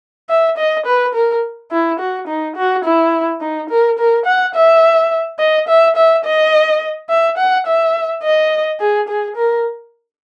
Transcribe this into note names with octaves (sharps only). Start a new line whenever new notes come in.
E5
D#5
B4
A#4
E4
F#4
D#4
F#4
E4
D#4
A#4
A#4
F#5
E5
D#5
E5
E5
D#5
E5
F#5
E5
D#5
G#4
G#4
A#4